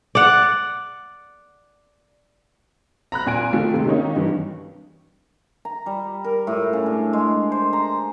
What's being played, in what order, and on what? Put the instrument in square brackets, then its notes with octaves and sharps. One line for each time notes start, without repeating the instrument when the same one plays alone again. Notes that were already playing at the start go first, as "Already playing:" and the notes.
[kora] D5 F#5
[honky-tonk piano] A#5 B5 F#6
A#2 G#5 D7
D#3 A3 F4
C3 G#3
D#3 A#3 C#4 D#4
G2 E3
[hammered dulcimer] A#5
G3
A#4
A2
C#3
D4
G#3
C5
A#5